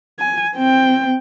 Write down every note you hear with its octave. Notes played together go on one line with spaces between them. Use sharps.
G#5
C4 G5